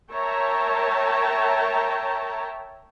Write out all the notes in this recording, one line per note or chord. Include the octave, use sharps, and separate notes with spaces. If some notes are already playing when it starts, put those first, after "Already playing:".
A#4 C#5 E5 G5 A5 A#5